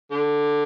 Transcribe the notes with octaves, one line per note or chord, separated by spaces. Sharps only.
D3